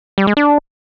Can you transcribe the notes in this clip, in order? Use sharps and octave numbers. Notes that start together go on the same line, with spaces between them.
G3
G#3
D4